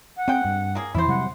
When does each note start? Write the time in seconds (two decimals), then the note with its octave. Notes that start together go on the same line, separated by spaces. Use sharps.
0.16 F#5
0.28 G#3 C4 G5
0.45 G2
0.75 A#3 G#4
0.94 F2 E3 E4 C5
1.08 C3 F#3 G3 F#5